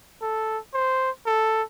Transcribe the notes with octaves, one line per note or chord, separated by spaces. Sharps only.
A4
C5
A4